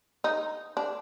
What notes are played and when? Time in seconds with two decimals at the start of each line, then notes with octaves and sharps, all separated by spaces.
0.24 D#4
0.77 D4